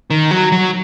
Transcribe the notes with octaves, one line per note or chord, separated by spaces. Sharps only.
D#3
F#3
F#3